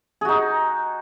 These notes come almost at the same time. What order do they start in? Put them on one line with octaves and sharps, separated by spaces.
G#4 F#4 D#4